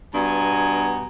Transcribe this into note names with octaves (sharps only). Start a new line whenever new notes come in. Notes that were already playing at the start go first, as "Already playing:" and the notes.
G2 B2 B3 G#5 A#5